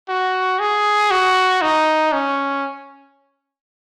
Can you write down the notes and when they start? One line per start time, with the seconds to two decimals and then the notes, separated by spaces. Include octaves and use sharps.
0.09 F#4
0.60 G#4
1.11 F#4
1.62 D#4
2.12 C#4